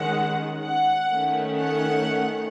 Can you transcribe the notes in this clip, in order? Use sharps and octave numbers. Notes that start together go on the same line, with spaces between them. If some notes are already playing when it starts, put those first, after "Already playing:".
Already playing: D#3 G#3 C#4 F#5
F#5
D#3 A3 C#4
F#5